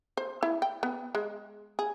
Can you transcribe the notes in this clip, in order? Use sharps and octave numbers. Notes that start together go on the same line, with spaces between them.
C5
E4
G5
B3
G#3
G#4